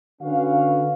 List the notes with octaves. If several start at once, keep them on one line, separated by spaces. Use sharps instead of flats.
D3 C#4 F#4 B4 F5